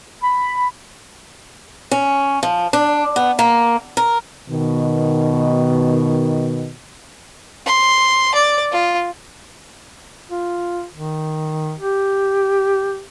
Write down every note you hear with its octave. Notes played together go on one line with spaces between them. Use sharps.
B5
C#4
F3
D4
B3
A#3
A#4
B2 D#3
C6
D5
F4
F4
D#3
G4